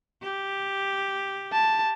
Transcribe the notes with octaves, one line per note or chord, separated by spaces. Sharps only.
G4
A5